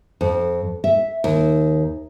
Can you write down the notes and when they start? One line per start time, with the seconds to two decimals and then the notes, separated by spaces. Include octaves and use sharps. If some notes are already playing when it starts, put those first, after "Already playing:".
0.21 F2
0.84 E5
1.24 D#2